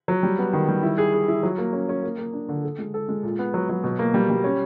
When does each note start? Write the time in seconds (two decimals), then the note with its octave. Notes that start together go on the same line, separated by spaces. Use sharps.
0.08 F#3
0.23 G3
0.39 B3
0.53 D#3
0.68 G3
0.83 E4
0.98 G#4
1.14 G#4
1.28 E4
1.43 F#3
1.58 A#3
1.73 C#4
1.89 C#4
2.03 A#3
2.18 A#3
2.33 D4
2.49 D3
2.64 A4
2.79 G#3
2.94 A4
3.09 G#3
3.23 A#2
3.39 B3
3.54 F#3
3.69 F#3
3.84 B2
3.99 A#3
4.14 G3
4.30 G3
4.44 C#4